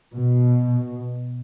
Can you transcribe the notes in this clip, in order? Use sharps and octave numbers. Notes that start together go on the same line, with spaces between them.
B2